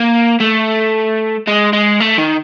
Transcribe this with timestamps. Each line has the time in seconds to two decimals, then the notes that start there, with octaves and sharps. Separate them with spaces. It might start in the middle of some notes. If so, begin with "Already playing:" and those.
Already playing: A#3
0.40 A3
1.48 G#3
1.73 G#3
2.00 A3
2.18 D#3